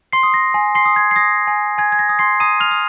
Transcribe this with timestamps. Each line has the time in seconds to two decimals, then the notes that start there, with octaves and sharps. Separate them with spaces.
0.13 C6 C7
0.23 D#6
0.34 A#6
0.54 G#5
0.75 C6 C7
0.86 D#6
0.96 G#6
1.11 C7
1.16 D#6 A#6
1.47 G#5
1.78 G#5 G#6
1.92 G#6
1.99 A#6
2.09 D#6
2.19 C6 C7
2.40 A#5 D#6 D#7
2.60 F6 F7
2.71 D#6